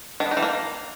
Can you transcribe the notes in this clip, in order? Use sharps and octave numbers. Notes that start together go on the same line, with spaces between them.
D#3
B3
D#4
E3
A#3